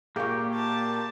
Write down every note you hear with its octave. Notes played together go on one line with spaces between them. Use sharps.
A#2 A#3 G4 G#4 F5 C#6
A5